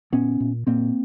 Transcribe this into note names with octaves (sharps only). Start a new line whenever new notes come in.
A#2 B3 C#4
A#2
A#2 A#3 C4